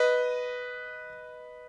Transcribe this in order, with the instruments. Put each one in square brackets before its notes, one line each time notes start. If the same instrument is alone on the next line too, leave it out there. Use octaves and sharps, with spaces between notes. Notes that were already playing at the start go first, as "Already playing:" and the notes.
Already playing: [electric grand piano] B4 D#5